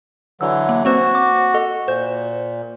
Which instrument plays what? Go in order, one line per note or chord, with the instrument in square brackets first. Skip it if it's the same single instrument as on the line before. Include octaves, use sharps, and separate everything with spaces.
[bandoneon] D3 E3 F#3 [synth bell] E6
[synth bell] A#3
[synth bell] A#3 C4 C5 [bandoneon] F#4
[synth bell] D6
A4 D#5
[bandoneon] A#2 [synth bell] C5 G6